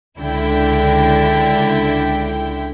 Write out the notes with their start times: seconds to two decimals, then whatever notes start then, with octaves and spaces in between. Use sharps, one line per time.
0.17 C#2 D3 E4 G5